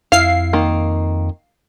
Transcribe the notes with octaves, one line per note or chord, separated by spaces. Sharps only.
F2 E4 F5 C7
D#3 A#3